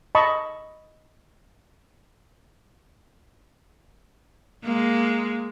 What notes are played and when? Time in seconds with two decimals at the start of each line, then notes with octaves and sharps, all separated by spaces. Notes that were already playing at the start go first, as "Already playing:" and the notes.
0.15 D#5 A5 B5 C#6
4.64 G#3 A#3